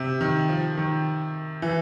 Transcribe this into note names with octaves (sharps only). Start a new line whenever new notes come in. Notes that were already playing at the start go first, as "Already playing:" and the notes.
Already playing: C3
D#3
F3
D#3
E3